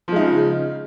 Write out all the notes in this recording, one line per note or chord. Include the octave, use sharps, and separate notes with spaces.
C#3 F3 G#3 D#4